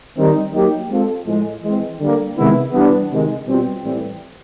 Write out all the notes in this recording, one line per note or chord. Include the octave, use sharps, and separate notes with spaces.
D#3 G3 C4 D#4
F#3 A#3 D#4 G4
G#3 C4 F4 A4
A2 F3 G#3
E3 G#3 C4
D3 G3 A#3
C3 D#3 G#3 B3 E4
E3 G3 B3 D4
C3 D#3 G#3
B2 G3 C4 F4
A2 E3 G3 C4